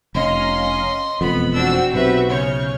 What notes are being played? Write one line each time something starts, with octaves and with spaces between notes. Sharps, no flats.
F1 C#4 D#5 F5 A#5 C6
E1 F2 B3 B5
C4 D4 F#4 E6
B1 C3 B4 E5
C#3 C#5 F6 G6